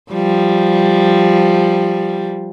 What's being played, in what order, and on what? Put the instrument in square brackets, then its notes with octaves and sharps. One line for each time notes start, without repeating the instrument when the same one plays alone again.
[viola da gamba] F3 G3